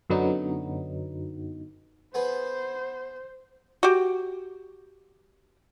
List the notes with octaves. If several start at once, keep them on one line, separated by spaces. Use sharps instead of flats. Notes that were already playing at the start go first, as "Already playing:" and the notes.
F#2 D3 F#3 B3 D#4
B3 G#4 B4 C5
F#4 G4